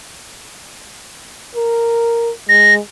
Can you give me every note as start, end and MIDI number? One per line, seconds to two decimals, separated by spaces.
1.55 2.32 70
2.49 2.80 56
2.49 2.74 94